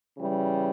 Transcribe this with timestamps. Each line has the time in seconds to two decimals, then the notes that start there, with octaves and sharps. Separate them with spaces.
0.18 C#3 E3 G3